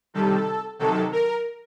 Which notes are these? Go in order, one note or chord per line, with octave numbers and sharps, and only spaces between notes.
C3 D#3 G3 A4
C3 D#3 F#3 A4
A#4